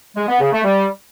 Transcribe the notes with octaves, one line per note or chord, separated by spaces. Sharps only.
G#3
B3
C#3
A3
G3